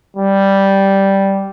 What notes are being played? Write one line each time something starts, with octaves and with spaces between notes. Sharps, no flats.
G3